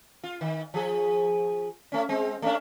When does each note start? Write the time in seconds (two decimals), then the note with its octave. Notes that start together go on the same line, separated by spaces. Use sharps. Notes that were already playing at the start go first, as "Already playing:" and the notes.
0.24 F4
0.41 D#3
0.74 F3 G#4
1.92 A3 C#4
2.09 G#3 C4
2.42 A3 C#4 D4